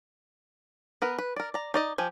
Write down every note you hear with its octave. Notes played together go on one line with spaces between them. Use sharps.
B3 A#4 B4
B4
A#4 D5
D5 A#5
D#4 D5 D#5
F3 G4 G#5